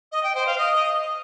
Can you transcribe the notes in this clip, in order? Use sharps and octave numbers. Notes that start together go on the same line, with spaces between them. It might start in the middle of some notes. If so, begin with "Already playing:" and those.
D#5
G5
C5
F5
D#5